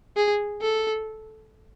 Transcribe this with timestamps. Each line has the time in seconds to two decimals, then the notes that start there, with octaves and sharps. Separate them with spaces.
0.16 G#4
0.62 A4